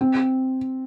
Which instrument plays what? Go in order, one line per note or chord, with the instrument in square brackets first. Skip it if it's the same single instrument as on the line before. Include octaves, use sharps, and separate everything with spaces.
[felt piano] C4